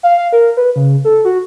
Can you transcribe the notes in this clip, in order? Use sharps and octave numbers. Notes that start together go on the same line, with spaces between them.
F5
F5
A#4
B4
C#3
A4
F#4